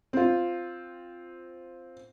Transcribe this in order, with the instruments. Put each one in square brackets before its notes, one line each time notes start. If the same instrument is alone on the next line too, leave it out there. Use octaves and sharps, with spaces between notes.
[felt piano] C4 F4